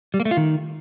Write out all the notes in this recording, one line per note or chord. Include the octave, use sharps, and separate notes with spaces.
G3
A#3
A3
F4
D#3